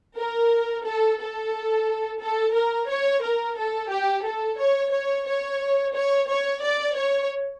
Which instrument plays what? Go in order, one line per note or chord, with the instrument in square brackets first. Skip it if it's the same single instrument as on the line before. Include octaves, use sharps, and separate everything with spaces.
[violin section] A#4
A4
A4
A4
A#4
C#5
A#4
A4
G4
A4
C#5
C#5
C#5
C#5
C#5
D5
C#5